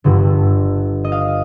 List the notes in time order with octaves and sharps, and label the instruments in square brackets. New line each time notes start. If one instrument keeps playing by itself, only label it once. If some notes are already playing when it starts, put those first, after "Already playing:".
[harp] G1 G2 D3
D#5
F5